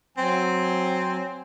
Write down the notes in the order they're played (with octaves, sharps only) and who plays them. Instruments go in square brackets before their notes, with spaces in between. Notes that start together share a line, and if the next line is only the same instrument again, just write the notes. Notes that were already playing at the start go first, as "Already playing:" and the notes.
[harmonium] F#3 G#5 [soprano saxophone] C4